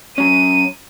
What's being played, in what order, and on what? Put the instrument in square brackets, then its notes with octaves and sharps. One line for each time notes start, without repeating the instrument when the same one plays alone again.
[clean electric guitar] F#3 C#4 [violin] D#7